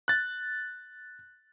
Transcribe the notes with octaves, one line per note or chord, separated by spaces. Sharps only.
F#6 A6